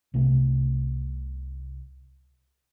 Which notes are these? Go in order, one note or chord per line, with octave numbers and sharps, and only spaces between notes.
C2 C3 A3